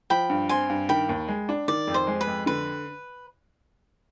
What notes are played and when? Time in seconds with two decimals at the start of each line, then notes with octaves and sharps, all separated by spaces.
0.10 F3 G5 B5
0.30 G2
0.49 C4 G#5 C6
0.70 G2
0.89 D#3 G5 B5
1.09 D#2
1.28 G#3
1.49 D4
1.68 D#3 D5
1.88 F2
1.94 C5
2.07 G#3
2.21 B4
2.27 F2
2.46 D3 B4